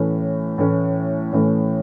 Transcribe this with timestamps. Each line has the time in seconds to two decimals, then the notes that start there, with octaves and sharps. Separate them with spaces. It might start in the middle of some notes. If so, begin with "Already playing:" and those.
Already playing: A2 E3 A3 C#4
0.58 A2 E3 A3 C#4
1.32 A2 E3 A3 C#4